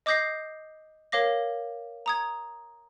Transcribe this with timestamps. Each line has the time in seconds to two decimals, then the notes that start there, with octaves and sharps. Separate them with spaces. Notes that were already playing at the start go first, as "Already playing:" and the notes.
0.06 D#5 D6 D#6 G6 A#6 C7
1.12 A#4 C#5 F5 D6 A#6
2.06 A#5 D#6 G#6